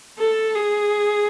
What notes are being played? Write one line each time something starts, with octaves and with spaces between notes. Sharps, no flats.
A4
G#4